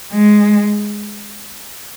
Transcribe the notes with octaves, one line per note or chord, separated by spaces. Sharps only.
G#3